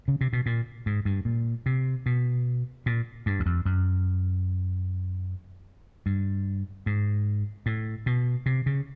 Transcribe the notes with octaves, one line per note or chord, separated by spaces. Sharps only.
C#3
C3
B2
A#2
G#2
G2
A#2
C3
B2
A#2
G2
E2
F2
F#2
G2
G#2
A2
B2
C3
C#3